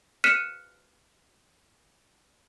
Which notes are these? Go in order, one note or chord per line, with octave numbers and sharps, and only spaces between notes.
F6 F#6 B6 C#7 D#7 E7